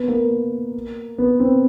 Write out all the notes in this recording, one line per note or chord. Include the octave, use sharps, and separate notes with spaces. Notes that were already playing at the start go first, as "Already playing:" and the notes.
Already playing: B3
A#3
B3
C4